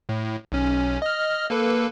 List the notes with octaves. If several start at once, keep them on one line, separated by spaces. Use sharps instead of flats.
A2
B1 C#4
D#5 F6
A#3 A4 B4